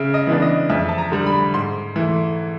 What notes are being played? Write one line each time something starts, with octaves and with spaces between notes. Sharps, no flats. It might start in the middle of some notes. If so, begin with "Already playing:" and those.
Already playing: C#3 E5
D#5
E3 G#3 B3 D4
D#5
F2 E5
A5
A#5
D3 G3
B5
G#2 C6
E3 A3